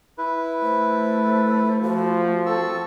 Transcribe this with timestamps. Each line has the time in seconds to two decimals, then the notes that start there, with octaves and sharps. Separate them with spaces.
0.18 E4 B4
0.62 A3 C5
1.82 F3 F#4
2.46 C4 A4 C#6 E6